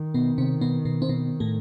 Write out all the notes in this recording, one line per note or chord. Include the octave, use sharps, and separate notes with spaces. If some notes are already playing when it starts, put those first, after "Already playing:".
Already playing: D#3
B2 B3
C3 C4
B2 B3
B2 B3
C4
B2 B3
A2 A3